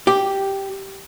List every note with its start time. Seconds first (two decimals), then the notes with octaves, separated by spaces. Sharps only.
0.07 G4